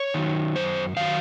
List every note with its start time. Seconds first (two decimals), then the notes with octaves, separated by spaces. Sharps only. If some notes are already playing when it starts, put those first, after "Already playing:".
Already playing: C#5
0.14 D#3 F#3
0.55 F#2 C5
0.97 D#3 F#3 F5